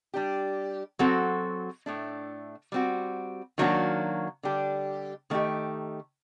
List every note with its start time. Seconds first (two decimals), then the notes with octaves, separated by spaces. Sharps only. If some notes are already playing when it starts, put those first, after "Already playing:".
0.14 G3 D4 G4
0.99 F#3 C4 F#4 A4
1.86 A2 A3 D4
2.72 G3 C4 F#4
3.58 D#3 F#3 A#3 D4 F#4
4.43 D3 G3 D4 G4
5.30 D#3 A3 D#4 G4